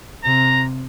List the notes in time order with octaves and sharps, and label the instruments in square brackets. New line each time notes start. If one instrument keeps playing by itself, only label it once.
[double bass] C3 [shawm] A#5